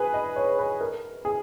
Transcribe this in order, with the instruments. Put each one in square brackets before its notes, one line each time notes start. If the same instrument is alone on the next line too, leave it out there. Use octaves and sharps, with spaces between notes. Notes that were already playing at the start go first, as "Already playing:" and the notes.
Already playing: [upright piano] G#4 B4
D#5
C#5
B4
A#4
G#4